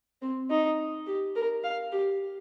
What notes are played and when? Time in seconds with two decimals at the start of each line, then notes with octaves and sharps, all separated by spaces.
0.22 C4
0.50 D#4
1.07 G4
1.35 A#4
1.64 F5
1.92 G4